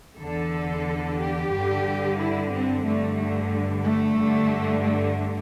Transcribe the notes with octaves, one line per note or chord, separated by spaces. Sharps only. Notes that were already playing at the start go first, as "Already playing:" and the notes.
E2 D3 A4
G4
G2 D3
E4
C4
G2 D3 A3
A3
A3
G2 D3
A3